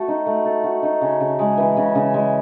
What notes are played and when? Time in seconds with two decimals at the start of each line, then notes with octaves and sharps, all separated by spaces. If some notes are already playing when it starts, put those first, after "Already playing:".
Already playing: A3 F#4 A4
0.08 D#4
0.26 A3
0.45 A4
0.64 F#4
0.83 D#4
1.01 C#3
1.20 C#3
1.39 G#3
1.58 E3
1.77 C#3
1.95 C#3
2.14 G#3